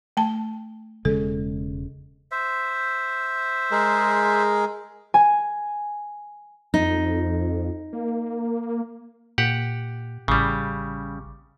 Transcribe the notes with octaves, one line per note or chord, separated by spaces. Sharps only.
A3 A5
E1 C#3 G#3 A4
C5 E5
G#3 G#4 A#4
G#5
F2 D#4
A#3
A#2 G4 F#5
A1 C#3 G3